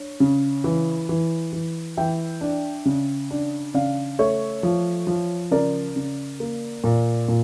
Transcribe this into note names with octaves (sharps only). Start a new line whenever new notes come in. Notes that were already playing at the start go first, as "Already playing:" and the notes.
Already playing: D4 C#5
C#3
E3
E3
E3
E3 E5 G5
D4
C#3
D4
C#3 D5 F5
A3 C#5 E5
F3
F3
C#3 A#4 D5
C#3
A#3
A#2
A#2